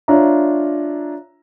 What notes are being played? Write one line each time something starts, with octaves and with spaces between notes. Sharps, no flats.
D4 F4 C#5 E5 A#5